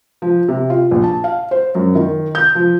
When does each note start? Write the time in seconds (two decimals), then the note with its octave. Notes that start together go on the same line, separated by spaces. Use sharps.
0.22 F3
0.48 C3
0.70 F4
0.91 A#1
1.04 A5
1.24 F5
1.51 C5
1.75 F#2
1.95 D#3
2.35 G6
2.55 F3